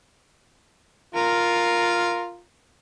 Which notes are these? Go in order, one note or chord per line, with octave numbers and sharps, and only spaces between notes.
F4 A#4